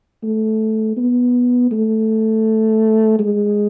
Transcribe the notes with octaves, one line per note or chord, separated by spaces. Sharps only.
A3
B3
A3
G#3